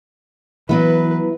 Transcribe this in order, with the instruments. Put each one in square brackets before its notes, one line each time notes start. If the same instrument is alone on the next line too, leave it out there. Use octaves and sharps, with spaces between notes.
[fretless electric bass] E3 [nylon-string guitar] F#3 B3 E5 [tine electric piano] E4 [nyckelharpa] B4